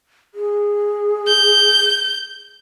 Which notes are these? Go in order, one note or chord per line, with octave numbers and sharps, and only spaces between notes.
G#4
G6